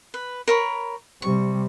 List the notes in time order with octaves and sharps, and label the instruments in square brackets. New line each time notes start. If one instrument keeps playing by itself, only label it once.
[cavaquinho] B4
A#4 C#5 B5
[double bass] C3 G3 [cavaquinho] C#6